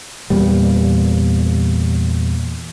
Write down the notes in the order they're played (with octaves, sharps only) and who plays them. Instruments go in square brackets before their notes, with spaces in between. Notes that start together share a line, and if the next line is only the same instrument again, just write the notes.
[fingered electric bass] E2 A#2 G3